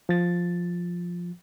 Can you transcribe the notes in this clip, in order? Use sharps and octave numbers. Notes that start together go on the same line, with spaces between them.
F3 A6